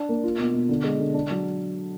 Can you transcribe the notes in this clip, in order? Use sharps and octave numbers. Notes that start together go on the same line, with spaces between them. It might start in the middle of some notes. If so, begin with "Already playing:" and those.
Already playing: D4
A#3
F4
B2
B2
D3
G#3
D3
D4
F#3